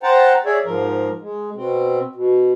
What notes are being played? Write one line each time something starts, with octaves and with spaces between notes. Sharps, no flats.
C5 F#5 G5 A5 A#5
G#4 C#5 D5 E5
G#2 F3 A#4
G#3
B2 C4
B2